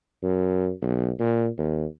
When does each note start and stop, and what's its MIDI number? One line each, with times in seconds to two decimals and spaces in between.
0.23 0.70 42
0.82 1.10 35
1.20 1.48 46
1.58 1.85 39